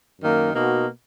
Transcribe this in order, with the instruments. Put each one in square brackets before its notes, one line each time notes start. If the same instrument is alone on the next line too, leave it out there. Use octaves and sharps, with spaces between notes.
[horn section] F#2 D#3 A#3
B2 A#3 D#4 F#4